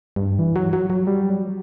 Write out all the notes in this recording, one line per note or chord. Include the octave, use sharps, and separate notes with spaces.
G2
E3
F#3
F#3
F#3
G3
F#3